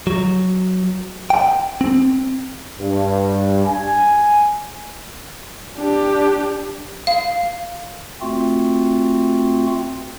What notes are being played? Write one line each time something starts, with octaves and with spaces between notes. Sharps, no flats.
F#3
G5
C4
G2
G#5
D4 G4
F5
A3 C4 F4 F#4